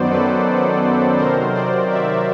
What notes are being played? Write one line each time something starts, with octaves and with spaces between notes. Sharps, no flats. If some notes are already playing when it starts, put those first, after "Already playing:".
Already playing: F#2 D#3 F#3 B3 C5 D5
A4 B4
C3 D#3 F#3 A#4 C5
C5 D5
D5 E5